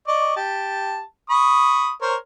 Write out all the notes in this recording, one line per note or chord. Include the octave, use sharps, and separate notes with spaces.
D5 D#5 C#6
G4 A5
B5 C#6 D#6
A#4 C5 C#5